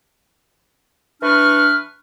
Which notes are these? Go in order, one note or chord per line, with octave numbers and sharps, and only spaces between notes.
E3 D4 B4 C#6 F6